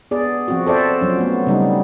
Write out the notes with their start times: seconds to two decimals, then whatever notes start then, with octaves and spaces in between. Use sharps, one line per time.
0.11 B3 G#4 D5
0.48 F3 C4 F#4
0.67 A4 C5 D5 E5
1.01 F3 F#3 C#4
1.18 A3 B3
1.47 C#3 G3 D#4